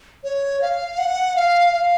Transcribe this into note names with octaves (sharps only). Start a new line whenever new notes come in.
C#5
F5
F#5
F5
F5